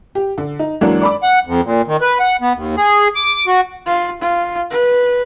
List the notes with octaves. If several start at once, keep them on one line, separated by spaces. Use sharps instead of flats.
G4
D3
D#4
E3 F#3 G#3 A#3 D4
D5 B5 D6
F#5
F2
A#2
D#3
B4
F#5
B3
D#2
G#4
D6
F#4
F4
F4
B4